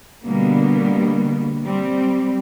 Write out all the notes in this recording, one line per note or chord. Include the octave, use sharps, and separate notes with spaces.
B2 D3 G3 A#3 B3
G3 C4